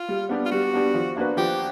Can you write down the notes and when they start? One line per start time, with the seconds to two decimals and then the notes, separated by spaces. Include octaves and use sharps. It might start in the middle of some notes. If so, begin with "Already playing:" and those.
Already playing: F4
0.09 G3
0.29 B3 D4 G4
0.46 F4
0.51 G3 F#4
0.73 B3 D4 G4
0.94 F3
1.16 A#3 D4 F#4 B4
1.37 F3 G4